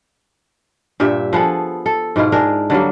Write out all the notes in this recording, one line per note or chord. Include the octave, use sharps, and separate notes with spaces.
G2 A#2 G4 E5
F3 B3 G#4 A4
A4
G#2 B2 E4 F4
D4 G#4 A#4
D3 F#3 G3 A#3